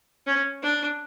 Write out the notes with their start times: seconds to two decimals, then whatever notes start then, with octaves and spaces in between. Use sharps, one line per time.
0.27 C#4
0.63 D4